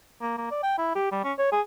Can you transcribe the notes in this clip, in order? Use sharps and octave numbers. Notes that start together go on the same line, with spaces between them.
A#3
A#3
D5
G5
E4
G4
G3
C#4
C#5
G#4